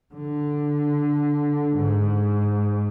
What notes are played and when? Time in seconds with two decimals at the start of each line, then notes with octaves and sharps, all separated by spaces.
0.14 D3
1.76 G#2